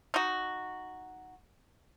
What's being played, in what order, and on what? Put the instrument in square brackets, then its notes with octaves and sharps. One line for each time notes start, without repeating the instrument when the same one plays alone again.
[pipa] D#4 F#4